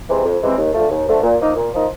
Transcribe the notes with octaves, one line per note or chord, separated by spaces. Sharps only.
C3 E3 G#3 C4
F2
C3 E3 G#3 C4
D#2
D3 F3 A3
D#2
D3 F3 A3
A#2
F3 A#3 D#4
A#2
F3 A#3 D#4